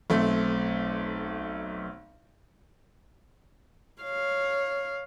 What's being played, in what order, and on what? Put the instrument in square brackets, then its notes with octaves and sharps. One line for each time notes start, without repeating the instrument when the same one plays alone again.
[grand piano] B1 A3 C4
[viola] C#5 F5